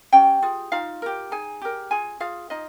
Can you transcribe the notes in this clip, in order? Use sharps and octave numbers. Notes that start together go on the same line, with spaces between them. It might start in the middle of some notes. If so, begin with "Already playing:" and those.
C#4 G4 G5
F4 G#4
D#4 F4 F5
G4 A#4
D#4 G#4 G#5
G4 A#4
F4 G#4 G#5
F4 G#4 F5
D#4 F4 D#5